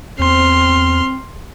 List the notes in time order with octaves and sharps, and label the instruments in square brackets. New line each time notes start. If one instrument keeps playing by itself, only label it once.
[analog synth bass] E2 [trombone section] C4 [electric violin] C6 F6